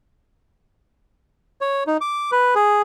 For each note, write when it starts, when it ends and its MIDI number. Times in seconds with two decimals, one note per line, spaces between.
1.61 1.84 73
1.87 1.97 63
2.01 2.31 86
2.32 2.54 71
2.55 2.82 68